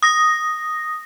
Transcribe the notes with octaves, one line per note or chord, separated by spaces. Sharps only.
D#6 A#6